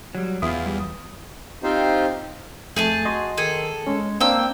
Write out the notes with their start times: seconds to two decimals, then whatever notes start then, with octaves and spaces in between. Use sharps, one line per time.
0.15 F#3 G3
0.42 E2 E4 F4 D#6
0.66 G3
1.63 C4 D#4 F4 G4 C5
2.76 F2 A3 G#4 G#5 A5 G6
3.05 F#4 D#5 C6
3.37 D#3 G#4 A4
3.87 G#3 C#4
4.21 A#3 C4 D4 G5 E6